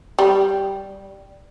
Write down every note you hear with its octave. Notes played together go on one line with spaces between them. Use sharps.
G3